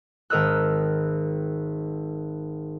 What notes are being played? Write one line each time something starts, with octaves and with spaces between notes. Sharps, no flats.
G#1 A#4 D#5 E6 F#6